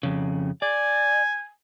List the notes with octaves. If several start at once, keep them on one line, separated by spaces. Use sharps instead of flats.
F2 C#3
D5 G#5